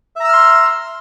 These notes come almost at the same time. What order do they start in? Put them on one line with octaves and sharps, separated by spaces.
E5 A#5 E6 F6 C6